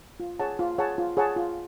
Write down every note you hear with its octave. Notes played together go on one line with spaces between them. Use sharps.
F4
G#4 C#5 F#5 A5
F4
G#4 C#5 F#5 A5
F4
G#4 C#5 F#5 A5
F4